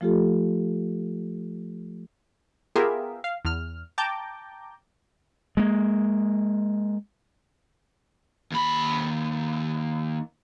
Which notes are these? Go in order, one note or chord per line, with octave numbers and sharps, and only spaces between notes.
F3 A3 F4 G4 A4
B3 F4 G4 G#4 A#4 E5
F5
E2 F6
G5 A5 A#5 D6 G6
G#3 A#3
D#2 B5